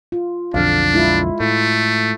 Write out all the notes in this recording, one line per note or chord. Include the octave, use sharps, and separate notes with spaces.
F4
B1 F2 D3 D4 F5
G#3 E4 F4
A2 A3